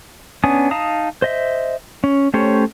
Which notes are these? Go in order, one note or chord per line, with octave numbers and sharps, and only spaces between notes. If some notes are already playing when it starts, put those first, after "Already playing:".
B3 C#4 D4 G#5 D#6
D#4 F5 A5 A#5 D#6
C5 D#5 E5
C#4
A3 C#4 G4 C5 C#5